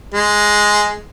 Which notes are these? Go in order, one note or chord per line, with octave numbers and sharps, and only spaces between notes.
G#3